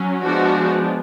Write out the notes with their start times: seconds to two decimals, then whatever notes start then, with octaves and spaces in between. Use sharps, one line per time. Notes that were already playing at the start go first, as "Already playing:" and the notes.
Already playing: F#3 C#4
0.26 F3 G#3 B3 D4 F#4